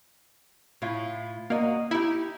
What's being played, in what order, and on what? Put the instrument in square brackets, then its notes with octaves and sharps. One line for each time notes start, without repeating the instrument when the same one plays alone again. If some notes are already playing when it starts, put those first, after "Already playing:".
[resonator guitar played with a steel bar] A2 E4 F4
[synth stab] A#3 [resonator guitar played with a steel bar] F#4 D#5
[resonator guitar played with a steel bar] D#4 G4 [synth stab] E4